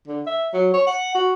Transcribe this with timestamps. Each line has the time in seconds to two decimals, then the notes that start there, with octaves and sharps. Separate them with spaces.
0.08 D3
0.27 E5
0.53 F#3
0.74 C#5
0.87 F#5
1.15 F#4